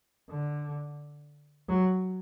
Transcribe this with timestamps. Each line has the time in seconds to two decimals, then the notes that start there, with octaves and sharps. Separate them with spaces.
0.29 D3
1.69 F#3